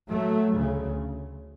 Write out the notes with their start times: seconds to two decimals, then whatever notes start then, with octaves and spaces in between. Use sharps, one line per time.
0.08 F#3 A3
0.54 D2 C#3